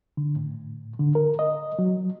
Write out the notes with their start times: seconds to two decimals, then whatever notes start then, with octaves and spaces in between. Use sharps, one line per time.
0.17 D3
0.36 A2
0.99 D3
1.15 A#4
1.39 D#5
1.79 F#3